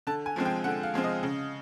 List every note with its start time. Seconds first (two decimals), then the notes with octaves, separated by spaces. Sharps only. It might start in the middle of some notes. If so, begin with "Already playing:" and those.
0.07 D3 A5
0.26 G#5
0.36 F3 G#3 C4
0.45 G5
0.64 D3 F#5
0.83 F5
0.94 F3 G#3 C4
1.04 D#5
1.23 C#3